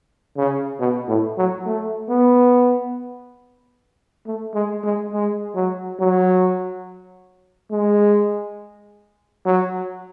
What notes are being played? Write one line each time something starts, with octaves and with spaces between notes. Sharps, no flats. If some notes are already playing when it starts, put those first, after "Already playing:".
C#3
B2
A2
F#3
A3
B3
A3
G#3
G#3
G#3
F#3
F#3
G#3
F#3